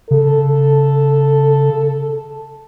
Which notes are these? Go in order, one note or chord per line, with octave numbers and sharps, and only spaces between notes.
C#3 A4